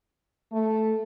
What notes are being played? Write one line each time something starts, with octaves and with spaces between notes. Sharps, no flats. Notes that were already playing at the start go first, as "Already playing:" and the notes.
A3